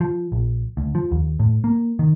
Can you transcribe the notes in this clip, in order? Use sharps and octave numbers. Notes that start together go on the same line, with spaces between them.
F3
A#1
D2
F3
D#2
A2
A#3
D#3